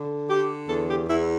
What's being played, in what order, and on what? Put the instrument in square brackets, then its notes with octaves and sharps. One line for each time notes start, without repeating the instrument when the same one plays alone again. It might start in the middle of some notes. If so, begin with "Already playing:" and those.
Already playing: [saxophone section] D3
D3 G4
E2 A4
G4
E2 E4